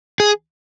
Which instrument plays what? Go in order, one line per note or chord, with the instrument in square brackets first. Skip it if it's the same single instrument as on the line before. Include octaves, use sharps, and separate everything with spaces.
[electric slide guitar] G#4